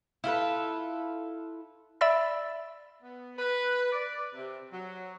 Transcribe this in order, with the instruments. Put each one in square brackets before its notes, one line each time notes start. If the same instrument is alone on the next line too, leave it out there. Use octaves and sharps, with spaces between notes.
[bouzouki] E4 F4 A4 B4
[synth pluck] D5 E5 B5 E6 A6
[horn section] B3
B4
D5
C3
F#3